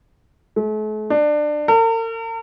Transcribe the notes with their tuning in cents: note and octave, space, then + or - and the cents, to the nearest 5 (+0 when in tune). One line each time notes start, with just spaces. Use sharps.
A3 -45
D4 +25
A#4 -45